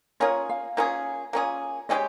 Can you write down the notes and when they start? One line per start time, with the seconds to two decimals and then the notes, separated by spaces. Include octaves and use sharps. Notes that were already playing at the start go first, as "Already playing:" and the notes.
0.20 A#3 C#4 F4 G#4 C#5
0.49 F5
0.77 A#3 C#4 F4 G#4
1.33 A#3 C#4 F4 G#4
1.89 C#3 G#3 C#4 G4 D#5